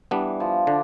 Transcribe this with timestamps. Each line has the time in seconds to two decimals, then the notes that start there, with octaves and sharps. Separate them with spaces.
0.11 E3 G3 B3 D4
0.40 F3
0.67 D3 D4